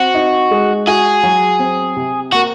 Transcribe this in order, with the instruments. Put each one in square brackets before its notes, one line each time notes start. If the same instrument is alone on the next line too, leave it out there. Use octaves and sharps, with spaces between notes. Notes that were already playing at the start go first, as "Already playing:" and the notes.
Already playing: [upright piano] C4 [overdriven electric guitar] F#4
[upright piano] D#4
G#3
[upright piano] F#4 [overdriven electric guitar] G#4
[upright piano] F#3
C4
C3
[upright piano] A#3 [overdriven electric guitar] F#4